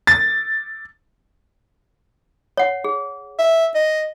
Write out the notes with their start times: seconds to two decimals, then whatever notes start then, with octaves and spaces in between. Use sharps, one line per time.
0.07 A6
2.57 C#5 F#5
2.84 G#4
3.39 E5
3.75 D#5